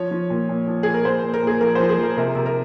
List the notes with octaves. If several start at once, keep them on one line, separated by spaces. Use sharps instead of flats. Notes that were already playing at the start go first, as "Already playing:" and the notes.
Already playing: F3 C#5
F3
A#2
A#2
F3
A#2 G#4
A#4
A#2 C5
A#2
A#4
A#2 G#4
F3 A#4
F3 C5
G#4
F3 A#4
C3 A#4
C3
A#4